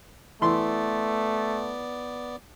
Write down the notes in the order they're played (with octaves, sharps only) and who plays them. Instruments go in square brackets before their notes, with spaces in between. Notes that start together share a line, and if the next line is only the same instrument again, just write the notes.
[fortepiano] E3 C6 [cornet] A3 [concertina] B3 D5